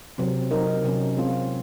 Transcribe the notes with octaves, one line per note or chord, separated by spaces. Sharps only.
C3 F#3 C4
F#3 C4 D#4 A#4
C3 F#3 C#4
G#3 C4 F4